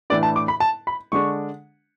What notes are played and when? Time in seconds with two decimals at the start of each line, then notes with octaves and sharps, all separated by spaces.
0.10 A2 E3 A3 D4 D5
0.23 A5
0.36 D6
0.48 B5
0.60 A5
0.87 B5
1.12 D3 G#3 D4 C#6